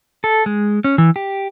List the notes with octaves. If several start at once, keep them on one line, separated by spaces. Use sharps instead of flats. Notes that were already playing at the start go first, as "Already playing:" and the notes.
A4
G#3
C#4
E3
G4